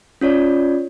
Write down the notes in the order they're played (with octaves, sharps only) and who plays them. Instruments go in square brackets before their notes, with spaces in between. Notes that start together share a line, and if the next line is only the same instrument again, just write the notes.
[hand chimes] C#4 F4 C#5 D5